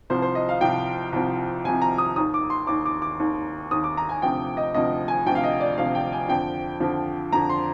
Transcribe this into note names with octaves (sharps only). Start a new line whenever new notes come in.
C2 C3 F3 C5
C5
D#5
F5
C2 C3 F3 G5
C2 C3 F3
C2 C3 F3 G#5
A#5
D#6
D#2 D#3 D#6
D6
C6
D#2 D#3 D6
D6
D6
D#2 D#3
D#2 D#3 D#6
D6
A#5
G#5
D2 C3 F3 G5
D#5
D2 C3 F3 D#5
G#5
D2 C3 F3 G5
F5
D#5
D5
D2 C3 F3 F5
G5
G#5
F2 D3 F3 G5
F2 D3 F3
F2 D3 F3 A#5
C6